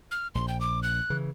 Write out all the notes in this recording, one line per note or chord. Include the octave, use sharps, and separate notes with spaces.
F6
A#1 C6
G5
D6
F#6
C#3 E3